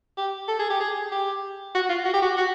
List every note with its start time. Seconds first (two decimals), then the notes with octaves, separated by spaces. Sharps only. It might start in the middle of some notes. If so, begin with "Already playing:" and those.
0.17 G4
0.48 A4
0.59 G#4
0.70 G4
0.80 G#4
1.12 G4
1.75 F#4
1.89 F4
2.05 F#4
2.14 G4
2.22 F#4
2.37 F#4